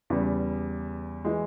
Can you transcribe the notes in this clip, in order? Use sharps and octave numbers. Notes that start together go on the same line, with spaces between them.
E2 C#3 G3
E3 G#3